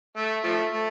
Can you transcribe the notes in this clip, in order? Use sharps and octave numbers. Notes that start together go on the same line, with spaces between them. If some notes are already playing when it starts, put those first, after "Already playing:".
A3
F3 A3
A3